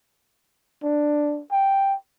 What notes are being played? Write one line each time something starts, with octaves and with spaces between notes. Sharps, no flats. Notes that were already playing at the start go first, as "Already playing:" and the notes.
D4
G5